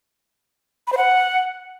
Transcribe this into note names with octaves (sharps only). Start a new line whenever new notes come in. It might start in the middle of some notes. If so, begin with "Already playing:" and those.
B5
C5
F#5